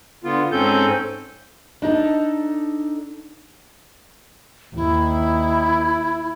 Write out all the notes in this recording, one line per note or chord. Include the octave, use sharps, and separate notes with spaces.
D3 B3 F4
G#2 C4 C#4 A4 G6
D4 D#4 A4
D#2 E4